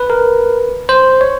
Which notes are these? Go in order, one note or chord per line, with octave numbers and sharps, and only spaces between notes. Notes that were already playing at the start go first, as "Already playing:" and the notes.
Already playing: B4
A#4
C5
C#5